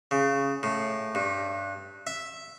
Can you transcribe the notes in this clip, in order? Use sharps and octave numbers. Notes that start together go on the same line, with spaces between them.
C#3
A2
G2
E5